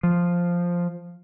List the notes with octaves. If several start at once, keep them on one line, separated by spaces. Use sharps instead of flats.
F3